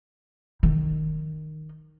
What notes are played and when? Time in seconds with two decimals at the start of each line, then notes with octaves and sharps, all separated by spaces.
0.63 D#3 D#4